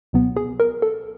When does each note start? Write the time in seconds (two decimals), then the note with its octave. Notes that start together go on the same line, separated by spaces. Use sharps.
0.13 C#2 B2 F#3 B3
0.36 G#4
0.60 A#4
0.82 A4